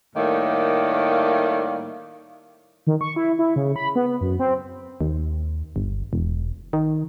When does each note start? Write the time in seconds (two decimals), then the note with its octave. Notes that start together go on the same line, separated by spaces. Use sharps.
0.16 A2 D#3 G3 A3 A#3
2.87 D#3
3.01 C#6
3.16 E4
3.39 E4
3.56 C#3
3.76 B5
3.95 B3
4.07 B3
4.21 F#2
4.39 C4
5.01 D#2
5.76 G1
6.13 E1
6.73 D#3